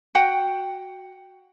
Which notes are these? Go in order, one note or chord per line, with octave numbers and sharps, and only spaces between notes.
F#4 F#5 G5